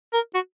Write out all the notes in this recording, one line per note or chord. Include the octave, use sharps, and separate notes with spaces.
A#4
F#4